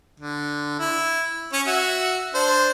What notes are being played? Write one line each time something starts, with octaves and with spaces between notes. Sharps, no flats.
D3
E4
C#4 C#5
F#4 E5
D4 C5